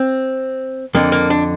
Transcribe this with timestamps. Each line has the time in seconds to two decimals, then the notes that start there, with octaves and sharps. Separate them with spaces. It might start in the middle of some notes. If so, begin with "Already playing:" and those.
Already playing: C4
0.95 F2 D3 A#3
1.12 A#3
1.30 D4